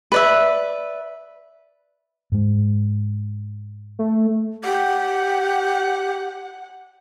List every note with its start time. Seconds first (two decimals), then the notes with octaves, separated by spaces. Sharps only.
0.12 B4 D5 E5
2.32 G#2 G#3
3.99 A3
4.64 G4 F#5